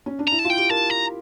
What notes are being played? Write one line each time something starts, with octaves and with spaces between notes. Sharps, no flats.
C#4
D4
E4 A#5
A5
F4
G5
G4
A#4 A5
A#5